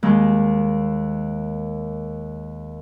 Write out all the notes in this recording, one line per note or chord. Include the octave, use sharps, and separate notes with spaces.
D#2 G#3